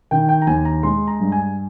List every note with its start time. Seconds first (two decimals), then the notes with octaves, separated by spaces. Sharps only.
0.11 D#3 G5
0.29 G5
0.42 A#5
0.47 D#2 G#5
0.65 A#5
0.83 G#3 C6
1.07 A#5
1.20 G2
1.32 G#5